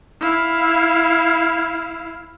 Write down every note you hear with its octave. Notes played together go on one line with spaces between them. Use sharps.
E4 F5